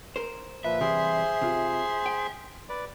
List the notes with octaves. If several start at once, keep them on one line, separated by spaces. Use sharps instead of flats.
A#4 C5
A#2 F3 B4 E5
C3 E3 G3 G#4 C5 C6
C3 F4
G5
B4 D5